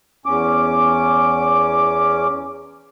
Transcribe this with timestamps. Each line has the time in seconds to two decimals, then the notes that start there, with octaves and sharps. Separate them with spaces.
0.26 E2 C#4 D6